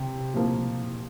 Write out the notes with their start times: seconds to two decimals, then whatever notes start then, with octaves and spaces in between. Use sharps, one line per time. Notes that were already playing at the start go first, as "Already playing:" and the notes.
Already playing: C3
0.34 C3 F3 A#3